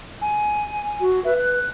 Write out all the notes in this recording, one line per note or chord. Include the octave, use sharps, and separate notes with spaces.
G#5
F#4
B4 E5
F#6